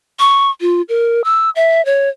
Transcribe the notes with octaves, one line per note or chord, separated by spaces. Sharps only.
C#6
F4
A#4
E6
E5
C#5